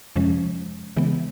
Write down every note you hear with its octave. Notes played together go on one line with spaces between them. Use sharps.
F2 C3 F3 G#3 C#4
C#3 E3 G#3 B3